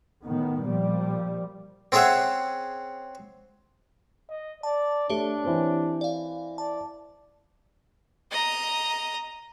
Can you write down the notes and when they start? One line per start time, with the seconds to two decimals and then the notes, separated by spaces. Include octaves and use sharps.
0.23 A2 D#3 B3
0.66 A#2 F3 G3
1.92 C4 C#4 G#4 C#5 E5 F#5
4.30 D#5
4.63 D5 A5
5.10 A3 D4 G4 C#5
5.44 E3 C4
6.01 D5 F5
6.58 D5 A5
8.31 D#5 A#5